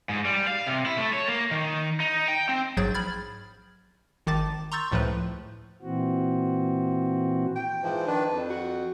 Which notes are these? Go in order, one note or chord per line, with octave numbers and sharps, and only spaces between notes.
G#2
G3
F5
C3
E4
A3
C#5
A#3
D#3
D#4
G5
C4
A#1 G#2 F#3 G#4 G6 A6
B5 F6 G#6 A6
G#1 D#3 A5 D6 A6
A#5 C6 C#6 E6 G6 A6
C#2 A2 F3 A3 B4
A#2 E3 C4 F#4
G5
G#2 E3 F3
D#3 D4 B4
F2
F#4